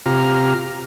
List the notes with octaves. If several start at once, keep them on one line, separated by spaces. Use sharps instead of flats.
C3 F4 G4 A#5 F6